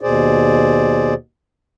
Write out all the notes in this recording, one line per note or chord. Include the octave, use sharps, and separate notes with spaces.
D#2 B2 G#4 C5 D5